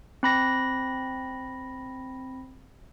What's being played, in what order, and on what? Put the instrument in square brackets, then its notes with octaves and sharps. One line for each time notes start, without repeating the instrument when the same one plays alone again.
[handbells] C4 B5 A#6